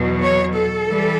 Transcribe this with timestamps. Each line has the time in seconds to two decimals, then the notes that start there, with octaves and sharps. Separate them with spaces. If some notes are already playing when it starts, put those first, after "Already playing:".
Already playing: E2 B2 F#3
0.21 C#5
0.54 A4
0.89 E3 G3